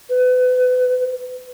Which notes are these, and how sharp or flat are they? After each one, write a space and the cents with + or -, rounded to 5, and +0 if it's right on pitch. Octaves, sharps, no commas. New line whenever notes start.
B4 +30